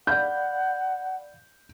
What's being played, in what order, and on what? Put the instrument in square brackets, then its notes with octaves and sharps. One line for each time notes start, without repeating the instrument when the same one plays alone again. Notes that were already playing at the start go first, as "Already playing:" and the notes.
[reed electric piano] D5 F5 B5 [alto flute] F#5 [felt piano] G6